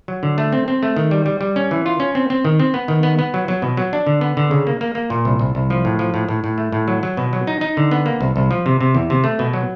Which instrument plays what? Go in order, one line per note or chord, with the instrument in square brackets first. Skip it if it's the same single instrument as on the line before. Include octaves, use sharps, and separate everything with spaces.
[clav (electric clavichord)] F#3
D3
A3
C4
C4
A3
D#3
G3
G3
G3
C#4
E3
F4
C#4
C4
C4
D#3
C4
B3
D#3
B3
B3
F#3
F#3
B2
F#3
D4
D3
B3
D3
C#3
A#3
A#3
A#3
A#2
C2
C2
C2
F3
A2
F3
A2
A2
A2
A3
A2
F#3
F#3
B2
F#3
D#4
D#4
D3
B3
A#3
C2
C2
F3
C3
C3
E2
C3
A3
B2
F#3